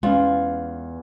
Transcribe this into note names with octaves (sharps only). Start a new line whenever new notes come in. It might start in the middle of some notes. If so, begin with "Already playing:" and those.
E2 G#3 C#4 F4